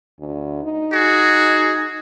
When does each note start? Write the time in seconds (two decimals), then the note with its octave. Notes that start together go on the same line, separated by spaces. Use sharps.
0.20 D2
0.63 D#4
0.93 F#4 G#4